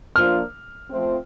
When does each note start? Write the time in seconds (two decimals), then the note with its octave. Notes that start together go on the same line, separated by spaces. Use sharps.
0.15 F3 A#3 D4 F4 C5 F6
0.90 F3 A3 C4